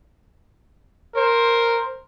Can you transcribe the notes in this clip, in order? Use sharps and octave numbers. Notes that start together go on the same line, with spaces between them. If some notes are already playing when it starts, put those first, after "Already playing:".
A#4 C5